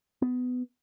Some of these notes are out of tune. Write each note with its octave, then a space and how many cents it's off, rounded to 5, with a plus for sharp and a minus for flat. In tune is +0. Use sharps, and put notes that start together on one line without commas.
B3 +20